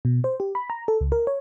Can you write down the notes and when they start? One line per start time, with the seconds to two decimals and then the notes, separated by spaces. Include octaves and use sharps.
0.05 B2
0.24 C5
0.40 G4
0.55 B5
0.70 A#5
0.88 A4
1.01 C#2
1.12 A#4
1.27 C#5